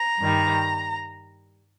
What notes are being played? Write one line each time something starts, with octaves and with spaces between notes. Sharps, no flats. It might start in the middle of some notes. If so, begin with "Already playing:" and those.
Already playing: A#5
G2 D#3 G3